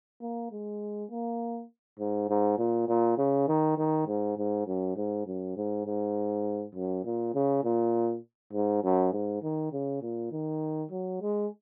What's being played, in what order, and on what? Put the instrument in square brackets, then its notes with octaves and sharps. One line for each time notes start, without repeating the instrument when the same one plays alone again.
[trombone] A#3
G#3
A#3
G#2
G#2
A#2
A#2
C#3
D#3
D#3
G#2
G#2
F#2
G#2
F#2
G#2
G#2
F#2
A#2
C#3
A#2
G#2
F#2
G#2
D#3
C#3
A#2
D#3
F#3
G#3